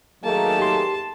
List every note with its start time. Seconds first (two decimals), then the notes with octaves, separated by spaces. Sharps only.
0.24 D#3 F#3 A3 A#3 D#4 G#4 A5
0.59 G4 C6